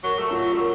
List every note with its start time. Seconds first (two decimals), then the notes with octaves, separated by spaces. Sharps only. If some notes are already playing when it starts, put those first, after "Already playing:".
0.04 F#3 A#4
0.19 A3
0.31 F#3 F4
0.53 A3
0.59 F#3 A#4